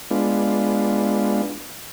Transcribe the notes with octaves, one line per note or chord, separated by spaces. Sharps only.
G#3 B3 D4 F4